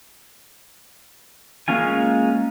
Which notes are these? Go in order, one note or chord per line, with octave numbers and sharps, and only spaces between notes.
G#3 A#3 C#4 F4 G#5